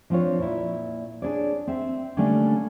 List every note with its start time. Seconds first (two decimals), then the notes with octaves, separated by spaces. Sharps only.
0.10 F3 C4 D4 F4 C#5
0.39 A#2 E4
1.22 D4 D#4 G#4 C#5 D5
1.67 C4 E5
2.17 D3 G3 A3 A#3 C#4 D4